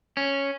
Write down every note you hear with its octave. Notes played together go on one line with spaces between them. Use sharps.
C#4